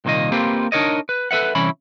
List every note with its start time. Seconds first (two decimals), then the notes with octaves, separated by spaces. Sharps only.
0.05 C2 A#2 D#3 A#3 D#5
0.32 A#3 C4 F4 G4 B4
0.72 D4 D#4 A#4 C#5 D#5
1.09 B4
1.31 A4 B4 E5 F#5
1.55 C2 E3 C#4 E4 B5